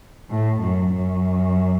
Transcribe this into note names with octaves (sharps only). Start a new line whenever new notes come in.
A2
F#2
F#2